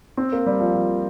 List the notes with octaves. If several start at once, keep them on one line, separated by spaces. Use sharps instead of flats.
C4
A#3
G3
F3
F3